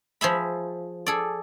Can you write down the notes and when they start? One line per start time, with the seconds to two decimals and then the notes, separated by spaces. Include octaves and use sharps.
0.21 F3 G#4 E5 B5
1.06 G#4 A4 D5